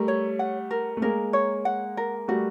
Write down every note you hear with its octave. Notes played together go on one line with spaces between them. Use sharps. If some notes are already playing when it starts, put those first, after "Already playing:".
Already playing: G3 A3 A#4
C#5
F#5
A#4
A3
G#3 A#3 A#4
C#5
F#5
A#4
G3 A3 F#4